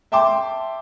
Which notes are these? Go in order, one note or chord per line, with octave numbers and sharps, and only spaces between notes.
E5 G5 A5 C6 D6